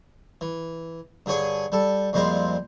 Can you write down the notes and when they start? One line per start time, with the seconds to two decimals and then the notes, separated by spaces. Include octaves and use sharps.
0.41 E3
1.26 G2 D3 G#4 C#5 G#5
1.72 G3 A4
2.13 F2 A#2 G3 G#3 C4 F5